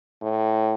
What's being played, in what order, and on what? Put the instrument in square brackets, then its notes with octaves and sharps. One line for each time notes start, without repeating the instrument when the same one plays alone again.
[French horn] A2